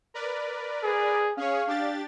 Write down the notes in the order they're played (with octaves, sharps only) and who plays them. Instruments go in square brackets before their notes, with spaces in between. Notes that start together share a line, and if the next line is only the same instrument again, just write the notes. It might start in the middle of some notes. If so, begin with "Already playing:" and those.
[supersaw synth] A#4 B4 D5
[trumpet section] G#4
[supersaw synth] C#4 G#4 C#5 [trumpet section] F5
[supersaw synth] D4 G4 A6